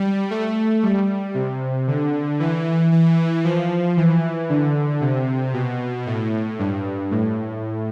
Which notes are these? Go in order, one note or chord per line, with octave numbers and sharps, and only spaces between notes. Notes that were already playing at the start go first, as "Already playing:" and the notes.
Already playing: G3
A3
G3
C3
D3
E3
E3
F3
E3
D3
C3
B2
A2
G2
A2